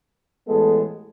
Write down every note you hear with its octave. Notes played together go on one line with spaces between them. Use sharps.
A1 A2 G#3 B3 A4